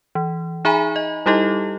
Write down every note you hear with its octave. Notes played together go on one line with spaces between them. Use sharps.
E3
D#4 G#4 E5 G#5 A#5 B5
D#5
G3 D#4 E4 G4 A4 D#5